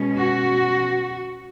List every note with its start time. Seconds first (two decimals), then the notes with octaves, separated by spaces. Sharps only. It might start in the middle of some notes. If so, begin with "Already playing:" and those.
Already playing: B2 G#3 C#4
0.19 F#4